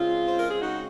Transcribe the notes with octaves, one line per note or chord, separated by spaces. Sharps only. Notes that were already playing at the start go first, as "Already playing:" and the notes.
Already playing: C#3 G#3 C4 F4
C5
A#4
G#4
C#3 G#3 C4 D#4 F#4